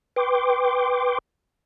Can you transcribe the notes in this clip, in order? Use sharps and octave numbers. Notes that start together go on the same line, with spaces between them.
B4 G5 C6 D6